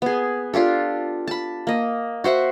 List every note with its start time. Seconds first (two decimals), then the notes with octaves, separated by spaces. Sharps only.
0.02 B3 G#4
0.54 D4 F4 G4 A4
1.27 A5 B5
1.67 A#3 D#5
2.24 F#4 C5 E5 F#5